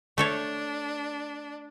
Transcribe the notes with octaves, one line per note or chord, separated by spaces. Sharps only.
A3 D4 A4 C#5